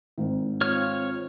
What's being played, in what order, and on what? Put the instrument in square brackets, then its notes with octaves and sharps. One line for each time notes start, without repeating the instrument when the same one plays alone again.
[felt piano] G#1 G#2 D#3
[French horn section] C4 F4 [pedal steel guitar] C#5 F6